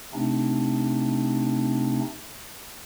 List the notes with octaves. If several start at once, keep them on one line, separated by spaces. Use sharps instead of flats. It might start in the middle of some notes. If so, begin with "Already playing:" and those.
C3 A3 C4 D4 D#4